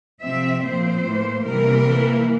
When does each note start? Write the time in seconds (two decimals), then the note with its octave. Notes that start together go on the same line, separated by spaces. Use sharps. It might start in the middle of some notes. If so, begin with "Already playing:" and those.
0.22 C3 F3 C4 E5
0.64 A#2 F3 C4 C5
1.05 A2 E3 A#3
1.45 C3 E3 G3 A#3 A#4
1.86 E3 A#3